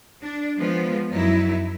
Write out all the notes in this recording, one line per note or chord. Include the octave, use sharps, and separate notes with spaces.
D4
F3 G#3 B3
F#2 F#3 D#4 E4